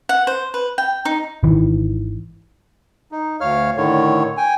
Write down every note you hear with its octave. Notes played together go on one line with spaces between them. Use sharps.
F#5
C5
B4
G5
D#4
G#1 D#3 E3
D#4
D2 C#5 F5 F6
A2 D3 D#3 C#5
G5 G#5